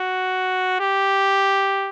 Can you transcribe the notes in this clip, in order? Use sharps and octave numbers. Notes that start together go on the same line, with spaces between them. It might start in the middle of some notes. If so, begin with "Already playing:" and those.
Already playing: F#4
G4